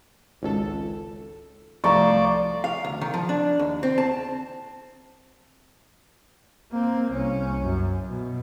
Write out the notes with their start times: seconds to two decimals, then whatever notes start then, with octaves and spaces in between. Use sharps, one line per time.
0.42 G#1 C#2 A4
1.84 C2 F3 A3 D5 A#5 C#6
2.64 F5
2.84 D2
3.01 D#3
3.14 F3
3.29 D4
3.59 D#2
3.83 C4
3.98 A5
6.71 A#3 C4
7.11 C2 C#4
7.62 F#2
8.08 B2